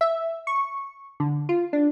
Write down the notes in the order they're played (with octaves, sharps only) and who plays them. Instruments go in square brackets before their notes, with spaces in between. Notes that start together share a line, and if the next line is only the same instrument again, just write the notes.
[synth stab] E5
C#6
D3
F4
D4